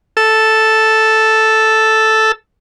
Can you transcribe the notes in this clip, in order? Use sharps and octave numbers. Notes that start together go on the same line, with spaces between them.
A4 E6